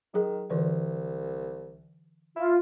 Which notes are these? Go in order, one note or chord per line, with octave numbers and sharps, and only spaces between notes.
D#3 F#3 G#4
C2 D3 E3 B4
E4 F4